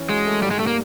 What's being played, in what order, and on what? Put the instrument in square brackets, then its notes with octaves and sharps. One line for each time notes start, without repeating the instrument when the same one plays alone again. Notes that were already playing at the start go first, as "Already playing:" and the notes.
Already playing: [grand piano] E3 C#4
[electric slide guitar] G#3 [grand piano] F#4
[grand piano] A3
[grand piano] G#2 [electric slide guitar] G3
[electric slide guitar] G#3
[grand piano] G3 [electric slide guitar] A3
[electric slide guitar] A#3